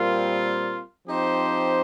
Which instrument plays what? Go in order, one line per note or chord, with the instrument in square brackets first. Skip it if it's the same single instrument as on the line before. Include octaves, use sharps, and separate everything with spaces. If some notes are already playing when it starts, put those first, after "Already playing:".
Already playing: [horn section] A#2 G3 C4 F4 A#4
F3 C4 D#4 G4 C5